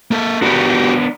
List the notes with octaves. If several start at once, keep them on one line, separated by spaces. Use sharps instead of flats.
A#3 A4
B3 D4 F#4 G4 A#4